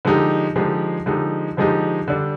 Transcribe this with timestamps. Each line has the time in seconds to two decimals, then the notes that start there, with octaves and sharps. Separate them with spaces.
0.05 D3 F3 G#3 D#4 G4
0.56 D3 F3 G#3 D#4 G4
1.06 D3 F3 G#3 D#4 G4
1.57 D3 F3 G#3 D#4 G4
2.08 D3 G3 D4